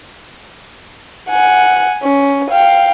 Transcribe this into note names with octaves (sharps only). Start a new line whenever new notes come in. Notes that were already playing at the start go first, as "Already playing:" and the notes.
F#5 G#5
C#4
F5 G5